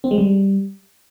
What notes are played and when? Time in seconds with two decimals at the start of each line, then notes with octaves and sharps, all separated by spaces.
0.04 C4
0.11 G#3
0.18 G3